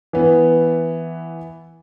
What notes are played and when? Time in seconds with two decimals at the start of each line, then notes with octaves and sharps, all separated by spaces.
0.13 E3 B3